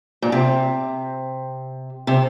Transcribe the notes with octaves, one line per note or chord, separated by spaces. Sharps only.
A#2
C3
C3